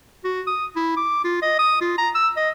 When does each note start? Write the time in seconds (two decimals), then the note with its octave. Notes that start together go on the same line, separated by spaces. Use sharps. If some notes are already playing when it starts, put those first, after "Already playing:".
0.24 F#4
0.47 D#6
0.76 E4
0.97 D6
1.24 F4
1.42 D#5
1.59 D#6
1.81 F4
1.98 A#5
2.15 E6
2.37 D#5